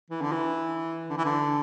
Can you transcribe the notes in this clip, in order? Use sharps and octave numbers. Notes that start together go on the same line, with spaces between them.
E3
D3
E3
D3
E3
D3